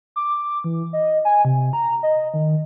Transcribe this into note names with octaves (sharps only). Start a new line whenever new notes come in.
D6
E3
D#5
G#5
C3
A#5
D#5
D#3